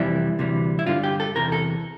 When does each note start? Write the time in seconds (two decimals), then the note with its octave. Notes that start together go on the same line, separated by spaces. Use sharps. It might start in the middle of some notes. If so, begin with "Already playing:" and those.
Already playing: F2 C3 E3 G3 E4
0.39 D2 C3 E3 G3
0.79 E4
0.86 G2 D3 G3 F4
1.04 G4
1.20 A4
1.35 E2 C3 E3 A#4
1.52 A4